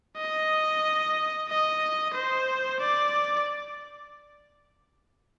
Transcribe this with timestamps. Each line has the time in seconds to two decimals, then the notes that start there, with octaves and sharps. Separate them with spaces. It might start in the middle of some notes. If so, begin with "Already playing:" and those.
0.17 D#5
1.49 D#5
2.14 C5
2.80 D5